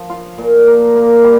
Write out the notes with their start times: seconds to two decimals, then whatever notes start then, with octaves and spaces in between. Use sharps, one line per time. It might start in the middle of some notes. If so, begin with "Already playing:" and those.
Already playing: F3
0.10 F4
0.38 A#2
0.67 A#3
0.96 A#3
1.24 G3